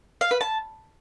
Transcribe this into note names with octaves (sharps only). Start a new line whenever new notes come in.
F5
B4
A5